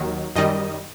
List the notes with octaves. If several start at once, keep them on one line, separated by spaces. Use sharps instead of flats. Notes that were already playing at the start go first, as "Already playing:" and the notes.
Already playing: D#2 D#3 F#3
F#2 D#3 G3 D#5